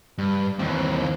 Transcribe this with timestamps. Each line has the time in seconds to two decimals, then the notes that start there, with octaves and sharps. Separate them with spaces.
0.18 G2
0.59 D#2 E3 C4